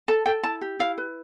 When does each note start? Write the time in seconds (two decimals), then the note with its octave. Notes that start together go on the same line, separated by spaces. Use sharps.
0.08 A4 A5
0.26 A4 G5
0.43 E4 A5
0.61 G4
0.79 E4 F5
0.98 B4